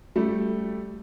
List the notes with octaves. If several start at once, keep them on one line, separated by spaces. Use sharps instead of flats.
G3 A3